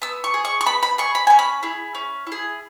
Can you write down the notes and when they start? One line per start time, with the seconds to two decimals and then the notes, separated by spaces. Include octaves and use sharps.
0.02 B3 E6
0.24 C#6
0.34 G#4
0.45 C#6
0.61 C#6
0.66 B3 B5
0.83 B5
0.98 G#4 C#6
1.15 B5
1.27 C#4 G#5
1.39 B5
1.63 E4 G#4
1.95 C#4
2.27 E4
2.32 G#4